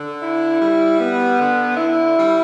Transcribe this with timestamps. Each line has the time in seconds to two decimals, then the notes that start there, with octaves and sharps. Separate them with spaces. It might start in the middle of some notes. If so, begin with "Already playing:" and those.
Already playing: D3
0.22 E4
0.61 G3
0.99 B3
1.39 D3
1.77 E4
2.17 G3